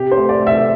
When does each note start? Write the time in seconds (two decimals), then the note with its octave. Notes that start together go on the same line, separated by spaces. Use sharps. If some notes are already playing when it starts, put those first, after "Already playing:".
Already playing: C3 G4
0.11 C5
0.17 A3
0.29 D5
0.41 A3
0.47 E5